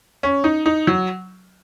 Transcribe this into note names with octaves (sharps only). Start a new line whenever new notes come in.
C#4
D#4
D#4
F#3